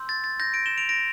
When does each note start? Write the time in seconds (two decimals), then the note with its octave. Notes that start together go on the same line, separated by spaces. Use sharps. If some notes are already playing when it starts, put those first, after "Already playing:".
Already playing: C6 E6 G6
0.09 A6
0.24 A6
0.40 G6 A#6
0.54 A#6 D7
0.66 E7 G7
0.78 D7 F7
0.89 A#6 D7